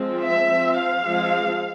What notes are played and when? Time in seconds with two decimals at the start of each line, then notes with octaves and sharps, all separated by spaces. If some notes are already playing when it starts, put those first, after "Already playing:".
Already playing: F3 G#3 C4
0.20 E5
0.48 F3 C4
0.77 F5
1.04 F3 G#3 C4